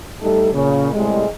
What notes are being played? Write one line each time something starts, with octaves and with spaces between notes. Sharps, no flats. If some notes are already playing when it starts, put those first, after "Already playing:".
G3 A3 D#4 A4
A#2 C#3
A2 C3 G3 G#3